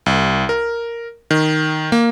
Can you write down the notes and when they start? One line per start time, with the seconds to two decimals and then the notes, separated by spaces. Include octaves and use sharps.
0.06 C2
0.49 A#4
1.31 D#3
1.92 A#3